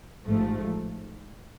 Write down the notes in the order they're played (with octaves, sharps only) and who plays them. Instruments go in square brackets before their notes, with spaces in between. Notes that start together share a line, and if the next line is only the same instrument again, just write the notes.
[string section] A1 G#2 F3 A3